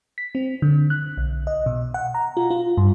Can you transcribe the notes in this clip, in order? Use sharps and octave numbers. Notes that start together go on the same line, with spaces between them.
B6
C4
D3
F#6
B1
D#5
B2
F#5
A#5
F4
F4
G2